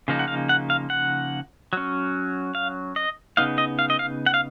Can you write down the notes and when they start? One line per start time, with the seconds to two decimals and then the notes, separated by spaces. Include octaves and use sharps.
0.08 C#3 F3 A#3 D#4
0.19 F#5
0.28 F5
0.49 F#5
0.70 F5
0.90 F#5
1.73 F#3 C#4
2.55 F5
2.96 D#5
3.37 C#3 F3 B3 D#4 F5
3.58 D#5
3.79 F5
3.90 D#5
3.99 F5
4.26 F#5
4.34 F5